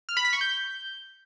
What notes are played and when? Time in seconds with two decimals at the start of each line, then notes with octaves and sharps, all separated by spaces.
0.09 F6
0.17 B5
0.25 B6
0.33 C#6
0.41 G6